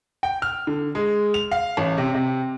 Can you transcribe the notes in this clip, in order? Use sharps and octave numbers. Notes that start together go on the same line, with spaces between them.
G5
F6
D3
G#3
F7
F5
A1
C3
C3